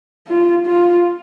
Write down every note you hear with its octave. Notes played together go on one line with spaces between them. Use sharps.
F4
F4